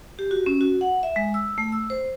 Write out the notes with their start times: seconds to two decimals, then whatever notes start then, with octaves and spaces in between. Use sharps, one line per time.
0.19 G4
0.31 F#4
0.46 C#4
0.61 F#4
0.81 F#5
1.03 E5
1.16 G#3
1.34 E6
1.58 A3
1.72 E6
1.90 C5